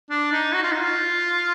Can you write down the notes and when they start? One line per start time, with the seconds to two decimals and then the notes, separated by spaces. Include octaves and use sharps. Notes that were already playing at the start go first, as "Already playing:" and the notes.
0.10 D4
0.32 D#4
0.53 F#4
0.63 F4
0.72 D#4
0.81 F4